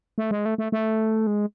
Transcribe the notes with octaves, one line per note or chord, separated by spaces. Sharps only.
A3
G#3
A3
A3
A3
G#3